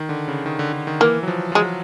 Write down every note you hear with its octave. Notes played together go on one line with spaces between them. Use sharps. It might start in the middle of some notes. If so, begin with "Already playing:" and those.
Already playing: D#3
D3
C#3
D#3
D3
D3
D#3
E3 A#3
F#3
F3
F3
F#3 G#3